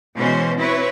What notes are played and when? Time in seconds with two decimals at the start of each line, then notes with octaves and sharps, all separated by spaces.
0.16 B2 E3 G#3 C#4 C5
0.57 C4 E4 B4 C#5